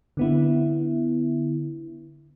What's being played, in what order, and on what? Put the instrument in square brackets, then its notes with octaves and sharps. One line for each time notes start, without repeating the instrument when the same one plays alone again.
[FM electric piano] D3 B3 E4